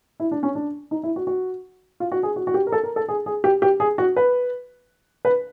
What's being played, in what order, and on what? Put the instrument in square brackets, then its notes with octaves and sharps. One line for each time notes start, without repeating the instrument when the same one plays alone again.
[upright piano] E4
D4
C#4
D4
D#4
E4
F#4
F#4
F4
F#4
G#4
F#4
F#4
G4
A#4
A4
A#4
A4
G#4
G#4
G4
G4
G#4
F#4
B4
B4